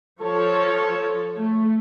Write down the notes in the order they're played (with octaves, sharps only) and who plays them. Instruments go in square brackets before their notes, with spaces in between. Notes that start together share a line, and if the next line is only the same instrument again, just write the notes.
[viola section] F3 C#5 [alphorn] A4
[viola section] A3